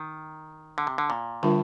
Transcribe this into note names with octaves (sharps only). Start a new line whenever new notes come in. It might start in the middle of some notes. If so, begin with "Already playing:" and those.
Already playing: D#3
D3
C3
D3
A#2
A2 D3 G3 D4 F4 A#4